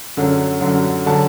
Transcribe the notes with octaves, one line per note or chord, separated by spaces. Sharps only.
F#2 D3 F#3
F#2 D3 F#3
D3 F#3 A5